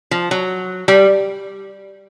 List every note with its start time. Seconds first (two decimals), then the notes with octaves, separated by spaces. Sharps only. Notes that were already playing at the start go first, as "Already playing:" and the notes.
0.11 F3
0.31 F#3
0.88 G3